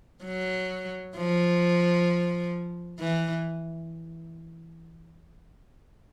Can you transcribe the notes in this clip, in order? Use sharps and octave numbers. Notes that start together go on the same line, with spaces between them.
F#3
F3
E3